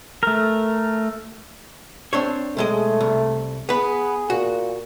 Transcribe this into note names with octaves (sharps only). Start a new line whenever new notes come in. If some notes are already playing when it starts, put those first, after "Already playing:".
A3 A#4
C4 D4 C#5
B1 G#3 A3 D#5
C2
B3 G#4 B4
A#2 F#4